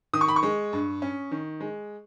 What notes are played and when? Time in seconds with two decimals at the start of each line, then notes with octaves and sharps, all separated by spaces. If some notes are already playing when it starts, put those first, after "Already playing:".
0.13 D#3 D#6
0.21 C#6
0.28 B5
0.36 C#6
0.43 G#3
0.73 G2
1.02 C#4
1.31 D#3
1.61 G#3